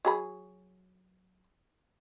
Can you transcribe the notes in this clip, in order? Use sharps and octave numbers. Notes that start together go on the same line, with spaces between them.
F#3 G#4 B5